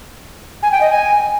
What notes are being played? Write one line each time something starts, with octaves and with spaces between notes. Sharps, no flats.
G#5
G5
D#5
G#5